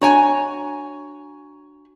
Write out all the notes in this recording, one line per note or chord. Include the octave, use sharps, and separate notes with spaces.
D4 F#4 C#5 G#5 A#5